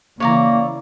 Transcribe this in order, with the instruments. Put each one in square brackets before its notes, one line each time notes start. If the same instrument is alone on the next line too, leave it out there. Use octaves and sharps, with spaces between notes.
[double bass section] C#3 E3 [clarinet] A#3 [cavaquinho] C#5 D5 A#5